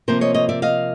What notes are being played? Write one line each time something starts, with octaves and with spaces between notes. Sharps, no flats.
C3 F3 A#3 A#4 C5
C#5 D#5
C#5 D#5
D5 E5
D#5 F5